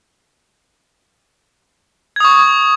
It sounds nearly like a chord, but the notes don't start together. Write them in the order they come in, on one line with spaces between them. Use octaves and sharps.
G#6 D#6 C#6